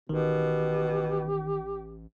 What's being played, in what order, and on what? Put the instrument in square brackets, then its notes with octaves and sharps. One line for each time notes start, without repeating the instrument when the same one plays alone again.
[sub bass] A1 [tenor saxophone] B2 [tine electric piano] D#3 [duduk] G4